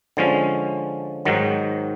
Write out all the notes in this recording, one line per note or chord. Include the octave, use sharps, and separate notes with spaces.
D3 F3 G#3 C#4
G#2 D#3 F#3